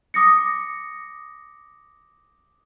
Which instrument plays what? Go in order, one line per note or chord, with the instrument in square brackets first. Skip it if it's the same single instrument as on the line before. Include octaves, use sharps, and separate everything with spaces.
[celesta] D6 D#6 A#6 C#7